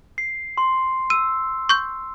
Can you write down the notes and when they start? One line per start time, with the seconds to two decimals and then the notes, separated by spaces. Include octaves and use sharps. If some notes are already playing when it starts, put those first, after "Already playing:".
0.18 C7
0.57 C6
1.10 E6 D#7
1.69 C#6 G6